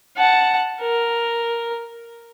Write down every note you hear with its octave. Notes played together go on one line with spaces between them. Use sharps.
F#5 A5
A#4